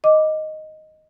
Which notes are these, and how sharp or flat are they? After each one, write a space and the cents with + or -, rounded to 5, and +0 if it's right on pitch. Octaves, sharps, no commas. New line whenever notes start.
D#5 +0 D6 +0